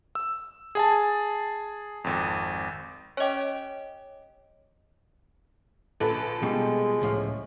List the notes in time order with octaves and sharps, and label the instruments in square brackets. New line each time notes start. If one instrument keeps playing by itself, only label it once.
[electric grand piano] E6
G#4 G#5 A5
G#1 F2
[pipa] C#4 G4 [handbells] C#5 D#5
[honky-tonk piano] A#1 A4 B4
[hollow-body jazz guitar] B2 G3 [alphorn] G#3
[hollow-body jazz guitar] C#2 A2 F3